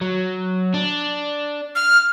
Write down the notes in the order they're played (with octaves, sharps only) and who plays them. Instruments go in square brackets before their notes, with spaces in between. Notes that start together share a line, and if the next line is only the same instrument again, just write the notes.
[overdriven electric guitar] F#3
D4
[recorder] F6